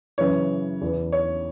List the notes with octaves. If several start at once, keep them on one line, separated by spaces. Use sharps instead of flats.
F#2 C#3 E3 C#5
E2 E3
C#5